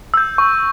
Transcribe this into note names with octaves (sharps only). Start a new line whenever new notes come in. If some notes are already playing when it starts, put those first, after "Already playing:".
E6 G6
C#6